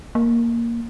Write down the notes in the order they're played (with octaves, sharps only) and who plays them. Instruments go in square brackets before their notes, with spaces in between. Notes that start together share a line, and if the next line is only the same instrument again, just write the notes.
[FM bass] A#3